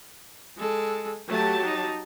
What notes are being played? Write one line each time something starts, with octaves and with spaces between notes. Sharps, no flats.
G#3 A4
F#3 A3 G4 A5
D#4